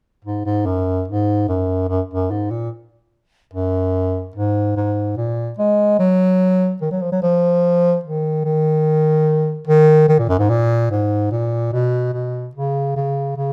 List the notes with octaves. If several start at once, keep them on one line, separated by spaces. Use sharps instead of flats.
G#2
G#2
F#2
G#2
F#2
F#2
F#2
G#2
A#2
F#2
G#2
G#2
A#2
G#3
F#3
D#3
F#3
F3
F#3
F3
D#3
D#3
D#3
D#3
A#2
F#2
G#2
A#2
G#2
A#2
B2
B2
C#3
C#3
C#3